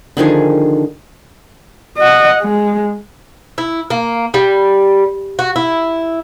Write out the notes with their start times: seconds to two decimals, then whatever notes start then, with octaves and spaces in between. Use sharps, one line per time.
0.17 D3 D#3 F3 G#4
1.98 D#5 F#5
2.42 G#3
3.58 E4
3.90 A#3
4.34 G3
5.39 F#4
5.56 E4